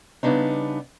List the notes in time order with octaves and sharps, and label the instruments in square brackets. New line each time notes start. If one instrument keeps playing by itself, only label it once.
[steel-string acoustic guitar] C#3 G3 B3 D4 D#4